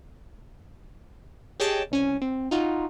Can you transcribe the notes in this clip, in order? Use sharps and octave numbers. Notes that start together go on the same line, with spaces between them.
G4 G#4 C#5 D#5 G5 A5
C2 C#4 G#5
C4
D#4 F4 F#4